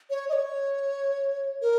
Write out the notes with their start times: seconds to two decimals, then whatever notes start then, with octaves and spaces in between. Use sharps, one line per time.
0.10 C#5
0.29 D#5
0.33 C#5
1.62 A#4